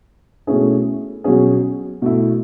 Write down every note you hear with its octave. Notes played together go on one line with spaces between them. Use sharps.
B2 A3 C#4 E4 G#4
B2 F#3 C#4 G#4
B2 A3 E4